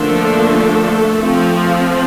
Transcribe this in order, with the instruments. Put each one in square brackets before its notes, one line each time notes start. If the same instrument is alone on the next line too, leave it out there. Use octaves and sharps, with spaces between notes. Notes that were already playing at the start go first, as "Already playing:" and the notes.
Already playing: [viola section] D3 F3 A3 A#3 D4 A4
F3 C4